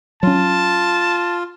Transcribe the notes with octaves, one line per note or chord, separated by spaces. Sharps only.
F#3 C#4 F4 A5